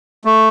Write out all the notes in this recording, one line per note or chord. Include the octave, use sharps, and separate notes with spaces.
A3